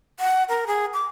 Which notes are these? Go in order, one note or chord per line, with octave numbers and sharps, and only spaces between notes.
F#5
A#4
G#4
D6